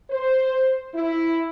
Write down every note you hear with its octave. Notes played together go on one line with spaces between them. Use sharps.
C5
E4